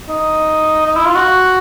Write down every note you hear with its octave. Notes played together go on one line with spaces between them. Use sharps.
D#4
D#4
E4
F4
F#4